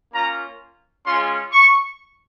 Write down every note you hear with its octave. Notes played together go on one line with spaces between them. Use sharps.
A#3 C#4 F4 A#5
G#3 C#4 F4 C6
C#6